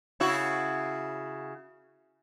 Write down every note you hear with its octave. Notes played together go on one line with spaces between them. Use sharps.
C#3 E4 F#4